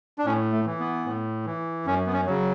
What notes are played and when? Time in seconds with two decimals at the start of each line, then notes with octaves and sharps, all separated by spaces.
0.18 D4
0.25 A2 C#4
0.52 A3
0.66 E3
0.80 B3
1.05 A2
1.46 E3
1.86 F#2 C#4
2.07 B3
2.13 C#4
2.27 C#3 F#3